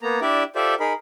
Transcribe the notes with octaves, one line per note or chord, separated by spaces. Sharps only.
A#3 B3 A#5
D4 E4 G4 D5 E5
F4 G4 A4 C5 D5 E5
D#4 G#4 A#4 B5